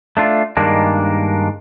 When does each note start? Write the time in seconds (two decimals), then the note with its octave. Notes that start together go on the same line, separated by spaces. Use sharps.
0.17 A3 D4 F4
0.57 G2 D#3 G#3 A#3 D4